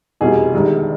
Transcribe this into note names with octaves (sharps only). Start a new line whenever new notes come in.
F1 E2 B2 G3 G#4
G1 G2 D#3 G#3